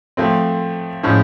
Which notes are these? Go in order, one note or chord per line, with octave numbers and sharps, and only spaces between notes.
F3 A3 C4
A2 F3 G#3 C#4